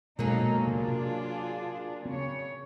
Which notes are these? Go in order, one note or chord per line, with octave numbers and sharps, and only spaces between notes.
B2 F#3 G#3 A#3 C4 C#4 D#4 A4
C3 D4 F4 G#4
C#3 C4 C#5